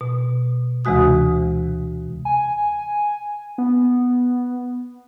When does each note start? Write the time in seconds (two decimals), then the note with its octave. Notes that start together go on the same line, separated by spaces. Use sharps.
0.01 B2
0.85 D2 C3 E3 G#3 F#4 D#6
2.25 G#5
3.58 B3